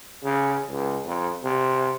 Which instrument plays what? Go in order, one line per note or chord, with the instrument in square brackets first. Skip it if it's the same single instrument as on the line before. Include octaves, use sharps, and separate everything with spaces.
[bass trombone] C#3
C#2
F2
C3